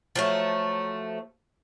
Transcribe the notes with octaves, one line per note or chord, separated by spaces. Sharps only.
F3 F#3 A3